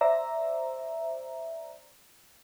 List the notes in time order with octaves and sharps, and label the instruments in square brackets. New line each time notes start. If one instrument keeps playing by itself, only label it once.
[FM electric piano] C5 D5 E5 A#5